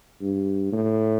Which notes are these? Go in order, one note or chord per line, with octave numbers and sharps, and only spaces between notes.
G2
A2